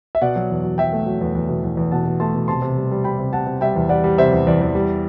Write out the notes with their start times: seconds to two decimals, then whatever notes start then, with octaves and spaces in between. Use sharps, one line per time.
0.15 E5
0.22 B2 D5 F#5
0.36 F#3
0.51 E2
0.64 F#3
0.78 F#3 E5 G5
0.93 A3
1.06 F#3
1.21 E2
1.35 E2
1.49 B2
1.63 E2
1.77 E2
1.91 B2 F#5 A5
2.06 B2
2.20 A3 A5 C6
2.34 B2
2.48 C3 A5 C6
2.62 C3
2.77 G3
2.91 G3
3.04 G3 G5 B5
3.19 C3
3.33 C3 F#5 A5
3.47 C3
3.61 G3 E5 G5
3.76 E2
3.89 G3 D5 F#5
4.04 G3
4.18 C3 C5 E5
4.32 E2
4.47 E2 D5
4.61 E2
4.75 G3